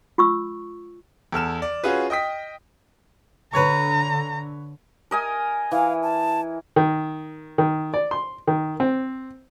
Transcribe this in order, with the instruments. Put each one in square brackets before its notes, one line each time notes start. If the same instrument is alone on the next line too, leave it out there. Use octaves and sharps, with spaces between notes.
[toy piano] F4 C#6 E6
[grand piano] E2 A4 F6 E7
D5
C#4 F4 F#4 G#4 B4
D#5 G5 D#6 B6
[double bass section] D3 [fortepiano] B4 C#5 C#6 [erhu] A#5
[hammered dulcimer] A#4 D#5 G#5
[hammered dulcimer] E3 [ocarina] F5
[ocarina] A5
[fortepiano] D#3
D#3
D5
C6
D#3
C4